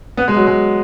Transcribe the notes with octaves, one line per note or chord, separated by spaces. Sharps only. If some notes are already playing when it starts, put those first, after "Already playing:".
B3
G#3
F#3
G#3